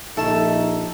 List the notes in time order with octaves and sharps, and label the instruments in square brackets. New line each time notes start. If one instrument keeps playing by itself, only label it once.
[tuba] A#1 [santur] A3 [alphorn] D#4 [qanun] A4 A5